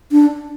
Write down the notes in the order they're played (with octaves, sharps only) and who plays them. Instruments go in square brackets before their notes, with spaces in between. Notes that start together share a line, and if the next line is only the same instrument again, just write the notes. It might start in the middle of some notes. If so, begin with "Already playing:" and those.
[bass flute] D4